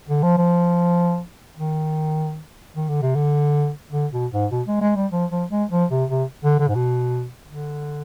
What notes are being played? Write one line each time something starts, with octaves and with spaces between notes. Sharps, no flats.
D3
F3
F3
D#3
D#3
D3
C3
D3
D3
B2
G#2
B2
G#3
G#3
G3
F3
F3
G#3
F3
C3
C3
D3
D3
G#2
B2
D3